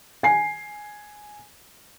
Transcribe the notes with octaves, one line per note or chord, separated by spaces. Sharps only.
G#5 C7